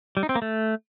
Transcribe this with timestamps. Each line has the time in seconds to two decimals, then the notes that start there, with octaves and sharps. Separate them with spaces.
0.17 G3
0.23 D#4
0.29 C4
0.35 A#3
0.42 A3